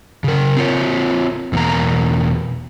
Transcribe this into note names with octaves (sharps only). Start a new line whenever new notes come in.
C#3 A#4
C4 F4 C#5
E2 B2 A#3 A#5